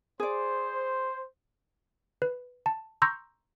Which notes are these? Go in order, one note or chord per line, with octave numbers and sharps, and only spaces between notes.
G#4 C5 D5
B4
A5
A#5 C6 C#6 E6 G6 A#6